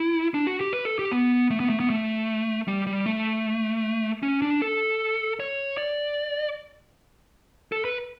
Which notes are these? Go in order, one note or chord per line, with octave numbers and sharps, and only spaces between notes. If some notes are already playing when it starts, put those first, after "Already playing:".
Already playing: E4
D4
F#4
G4
B4
A4
G4
B3
A3
B3
A3
B3
A3
G3
G3
A3
C#4
D4
A4
C#5
D5
A4
B4